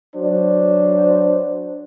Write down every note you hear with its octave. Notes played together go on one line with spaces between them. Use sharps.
F#3 D4 C5